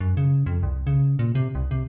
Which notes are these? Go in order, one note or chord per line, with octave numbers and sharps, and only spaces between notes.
F#2
C#3
F2
C2
C#3
A#2
C3
C2
C3